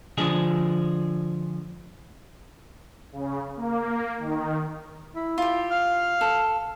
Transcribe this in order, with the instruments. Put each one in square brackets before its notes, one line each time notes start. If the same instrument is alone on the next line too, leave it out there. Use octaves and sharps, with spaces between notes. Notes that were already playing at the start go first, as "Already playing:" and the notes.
[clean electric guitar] D3 F3 G#3 D4 G#4
[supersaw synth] C#3
A#3
D#3
[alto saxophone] E4
[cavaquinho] F4 G4
[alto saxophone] F5
[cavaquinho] A4